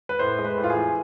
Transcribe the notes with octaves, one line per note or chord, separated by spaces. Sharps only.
B4
A2 C5
G#3
B4
A2
F4
G#4
E3